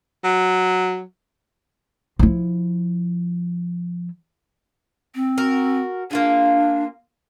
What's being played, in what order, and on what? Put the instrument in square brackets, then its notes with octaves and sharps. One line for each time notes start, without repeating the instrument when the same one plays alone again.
[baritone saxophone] F#3
[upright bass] F3 E4
[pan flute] C4
[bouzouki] F#4 A#4
[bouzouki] A#3 F4 G#4 [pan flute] D4